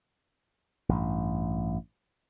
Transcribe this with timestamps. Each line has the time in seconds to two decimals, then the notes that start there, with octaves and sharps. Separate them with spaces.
0.89 A1 G2